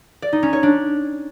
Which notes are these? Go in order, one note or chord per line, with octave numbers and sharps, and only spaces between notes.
D5
D#4
C#4
C#5
D4